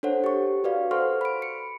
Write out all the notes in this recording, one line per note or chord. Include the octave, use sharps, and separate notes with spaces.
D4 A4 C5 C#5 F#5
G4 C#6
F#4 B4 D5 F5
A4 C5 F#5 C6 C#6 F6
B5 D7
C#7